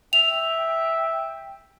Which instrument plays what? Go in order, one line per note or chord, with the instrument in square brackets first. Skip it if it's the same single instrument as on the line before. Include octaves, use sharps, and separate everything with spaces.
[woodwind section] E5 G5 [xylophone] F7